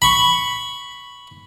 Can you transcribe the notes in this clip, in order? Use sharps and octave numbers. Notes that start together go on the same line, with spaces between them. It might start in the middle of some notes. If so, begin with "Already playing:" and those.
B5 C#6